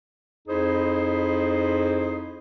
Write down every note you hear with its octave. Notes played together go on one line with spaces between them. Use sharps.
F2 D#4 E4 G#4 C5